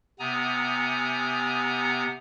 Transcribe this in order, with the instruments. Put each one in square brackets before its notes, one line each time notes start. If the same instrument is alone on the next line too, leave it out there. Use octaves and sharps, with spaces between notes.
[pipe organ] C3 B3 G#5 A#5 D#6